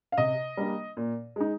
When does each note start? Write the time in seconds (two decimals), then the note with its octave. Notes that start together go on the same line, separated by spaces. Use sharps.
0.12 F5
0.18 C3 D#5
0.57 G3 A#3 D4
0.97 A#2
1.36 G#3 D#4